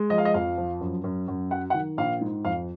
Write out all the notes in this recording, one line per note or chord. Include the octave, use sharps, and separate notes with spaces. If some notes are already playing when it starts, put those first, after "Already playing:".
Already playing: G#3
F3 D#5
F5
D#5
F2 F5
F3
F#2
F#2
F#2
F#3 F#5
F#5
D#3
A#1 F5
G#2
F2 F5